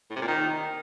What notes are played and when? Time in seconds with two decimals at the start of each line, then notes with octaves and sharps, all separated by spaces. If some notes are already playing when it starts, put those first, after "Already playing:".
0.10 A2
0.16 C3
0.22 A#2
0.28 D#3